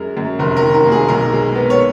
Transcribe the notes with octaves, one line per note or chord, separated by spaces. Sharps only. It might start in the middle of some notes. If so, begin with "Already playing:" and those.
Already playing: F#2 G#3 A#4
F#2
F1 A#4
A#4
D#3
A#4
A#3
G#4
B1 A#4
G#3
B3
C#5